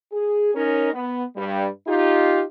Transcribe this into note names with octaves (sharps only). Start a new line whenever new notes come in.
G#4
C#4 D#4 A#4
B3
G2 G3
D#4 F4 G4